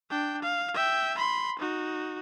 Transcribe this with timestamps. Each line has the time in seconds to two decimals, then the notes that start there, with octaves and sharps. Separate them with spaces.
0.11 D4 G5
0.42 F5
0.74 E5 G5
1.18 B5 C6
1.59 D#4 F#4